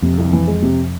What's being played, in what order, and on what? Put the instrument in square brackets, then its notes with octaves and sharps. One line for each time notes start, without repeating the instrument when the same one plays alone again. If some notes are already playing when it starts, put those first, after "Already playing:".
[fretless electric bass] F2 [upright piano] C3
[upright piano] C2
E3
G#3
C3